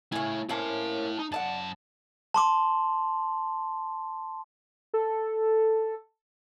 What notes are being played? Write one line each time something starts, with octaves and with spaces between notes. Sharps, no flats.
C#3 A3 E4 G#5
A#3 C4 C#4 E4 A5
D#4
F#2 D5 D#5 F#5 A5
A5 C6 D6
A4